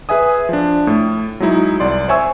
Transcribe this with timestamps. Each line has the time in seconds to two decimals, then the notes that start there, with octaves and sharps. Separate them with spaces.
0.09 G#4 B4 E5 G#5 D#6
0.49 F3 D4
0.87 A2
1.40 F#3 G#3 D#4 E4
1.80 C2 D5 C6
2.08 C5 C#5 E5 G#5 C#6 E6